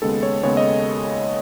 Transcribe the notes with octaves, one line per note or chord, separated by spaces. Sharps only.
D#2 C#3 G#3 B3 A4
C#5
D#2 C#3 G#3 B3 C#5
D#5